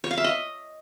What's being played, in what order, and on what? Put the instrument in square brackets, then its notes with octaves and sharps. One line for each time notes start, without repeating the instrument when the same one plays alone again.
[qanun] C#5
F5
E5
D#5